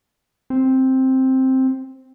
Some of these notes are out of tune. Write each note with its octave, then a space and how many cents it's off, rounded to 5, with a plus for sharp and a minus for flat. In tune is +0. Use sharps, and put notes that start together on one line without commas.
C4 +5